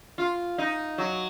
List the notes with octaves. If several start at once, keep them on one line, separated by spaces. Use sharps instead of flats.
F4
D#4
F#3